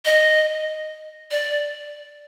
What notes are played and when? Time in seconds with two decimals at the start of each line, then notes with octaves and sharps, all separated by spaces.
0.05 D#5
1.31 D5